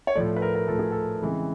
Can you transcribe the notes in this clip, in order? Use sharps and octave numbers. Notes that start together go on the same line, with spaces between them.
C#5
A2 F3 A3 D5
B4
A#4
A#4
A2 F3 A3 A4
G#4
A4
C#3 E3 G#3 C4